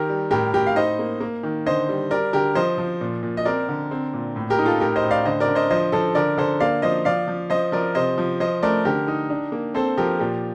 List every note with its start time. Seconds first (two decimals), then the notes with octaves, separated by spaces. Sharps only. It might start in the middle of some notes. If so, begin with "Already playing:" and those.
Already playing: D#3 G4 A#4
0.09 G3
0.31 A2 G4 A#4
0.53 A2 G4 A#4
0.67 F5
0.76 D#4 C5 D#5
0.99 A#3
1.20 A#3
1.43 D#3
1.66 D3 C5 D#5
1.89 G3
2.11 G3 A#4 D5
2.33 D3 G4 A#4
2.55 F3 C5 D#5
2.78 F3
3.01 A#2
3.23 A#2
3.37 D#5
3.45 C4 A#4 D5
3.68 D3
3.91 C4
4.13 A#2
4.36 A2
4.50 G4 A#4
4.58 D#4
4.66 F4 A4
4.80 A2 G4 A#4
4.96 C5 D#5
5.04 A2
5.11 D5 F5
5.25 D3 C5 D#5
5.40 A#4 D5
5.47 D3
5.55 C5 D#5
5.70 F3 C5 D#5
5.92 F3 A4 C5
6.15 D3 A#4 D5
6.37 D3 A4 C5
6.60 A#3 D5 F5
6.82 F3 C5 D#5
7.05 F3 D5 F5
7.28 F3
7.50 F3 C5 D#5
7.72 F3 A#4 D5
7.95 C3 C5 D#5
8.18 F3
8.40 F3 C5 D#5
8.62 A3 A#4 D5
8.85 D3 G4 A#4
9.08 D#4
9.30 D4
9.52 A#3
9.74 C4 A4 C5
9.97 F3 G4 A#4
10.19 A#2 G4